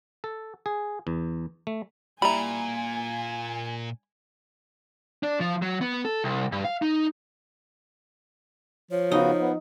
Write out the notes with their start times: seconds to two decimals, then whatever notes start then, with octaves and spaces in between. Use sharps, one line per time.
0.24 A4
0.66 G#4
1.07 E2
1.67 A3
2.22 A#2 G3 E4 G#5 A#5 B5
5.23 D4
5.40 F3
5.62 F#3
5.81 B3
6.05 A4
6.24 C2
6.52 G2
6.65 F5
6.82 D#4
8.91 F3 C#5
9.11 C#3 B3 D#4 F#4
9.41 B3